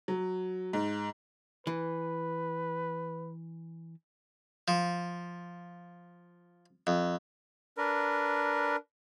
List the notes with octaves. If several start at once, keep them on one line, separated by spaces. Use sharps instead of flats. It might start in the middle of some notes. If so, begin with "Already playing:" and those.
F#3
G#2
E3 B4
F3
F2
D4 A#4 B4